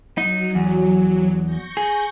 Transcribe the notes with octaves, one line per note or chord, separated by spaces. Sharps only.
F#3 D#4
E2
C#6 G6 A#6
G#4